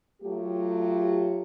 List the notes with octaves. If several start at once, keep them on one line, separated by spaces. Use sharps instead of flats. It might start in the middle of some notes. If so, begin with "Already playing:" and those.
F#3 A3 F4 G4